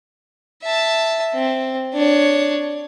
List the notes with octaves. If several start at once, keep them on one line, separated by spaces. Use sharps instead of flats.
E5 A5
C4
D4 C#5